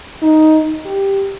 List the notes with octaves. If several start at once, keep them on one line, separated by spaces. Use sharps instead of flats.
D#4
G4